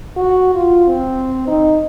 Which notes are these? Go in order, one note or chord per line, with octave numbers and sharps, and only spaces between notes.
F#4
F4
C4
D#4